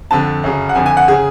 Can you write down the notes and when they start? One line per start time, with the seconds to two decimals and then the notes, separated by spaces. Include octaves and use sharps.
0.11 F2 D3 A5
0.44 F#2 C#3
0.69 F#5
0.75 F2 D3 G#5
0.86 G#5
0.97 F#5
1.08 C#3 G#4